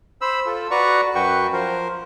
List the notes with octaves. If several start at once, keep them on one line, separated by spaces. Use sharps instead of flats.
C5 B5 E6
F4 A4
F#4 B4 D5 A#5 C#6
F#2 F#4 B4 G5 C#6
F3 A#4 C5